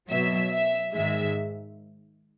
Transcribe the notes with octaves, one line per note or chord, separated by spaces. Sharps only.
B2 F#3 E5
E5
G#2 D#3 G#3 E5